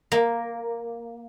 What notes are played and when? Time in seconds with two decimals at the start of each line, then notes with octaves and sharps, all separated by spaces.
0.12 A#3